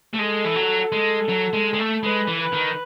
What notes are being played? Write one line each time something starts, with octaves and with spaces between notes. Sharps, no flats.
A3
G#3 A4
E3
F#3
G#3
F#3
G#3
G#3
A3
G#3 B4
E3
B4
D#3